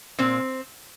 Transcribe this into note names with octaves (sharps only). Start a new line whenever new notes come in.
A#2 C4